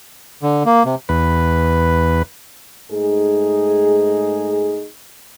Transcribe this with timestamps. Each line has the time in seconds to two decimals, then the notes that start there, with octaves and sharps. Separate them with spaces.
0.42 D3
0.66 A#3
0.85 C3
1.09 E2 B4
2.91 G#2 A3 D#4 G#4